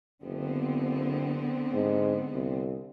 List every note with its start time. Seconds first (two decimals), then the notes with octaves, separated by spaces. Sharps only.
0.22 F#1 D3 B3 C4
1.73 G#2
2.33 C2